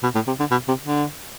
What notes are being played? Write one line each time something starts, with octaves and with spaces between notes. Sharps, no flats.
B2
A2
C3
D3
B2
C3
D3